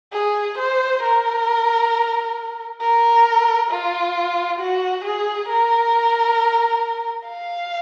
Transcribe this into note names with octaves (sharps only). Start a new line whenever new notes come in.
G#4
C5
A#4
A#4
F4
F#4
G#4
A#4
F5